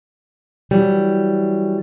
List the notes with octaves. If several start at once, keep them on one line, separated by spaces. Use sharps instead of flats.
E3 F#3 G3